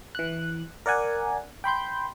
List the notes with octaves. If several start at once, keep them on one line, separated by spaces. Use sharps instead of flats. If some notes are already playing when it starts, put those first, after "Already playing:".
E3 F#6
A#4 D5 F#5 G#5
G5 B5 C6 G6